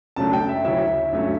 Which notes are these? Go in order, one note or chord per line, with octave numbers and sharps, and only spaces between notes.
F#2 C#3 F#3 A3 D4 A5
G5
E5
D2 C#3 F#3 C#4 E4 E5
G2 F#3 A3 C#4